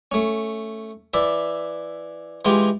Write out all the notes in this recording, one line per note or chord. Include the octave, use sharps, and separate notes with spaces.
A3 C#4
E3 D5 E5
E3 G#3 F4 G4